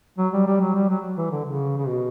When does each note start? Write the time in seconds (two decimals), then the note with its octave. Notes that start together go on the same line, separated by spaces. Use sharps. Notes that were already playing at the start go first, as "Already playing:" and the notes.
0.18 F#3
0.33 G3
0.46 G3
0.61 F#3
0.75 G3
0.88 F#3
1.17 E3
1.31 D3
1.45 C#3
1.77 C#3
1.87 B2